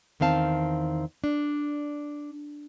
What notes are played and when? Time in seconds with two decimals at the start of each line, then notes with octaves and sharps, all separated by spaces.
0.20 E2 D#3 C4 F5 A5
1.24 D4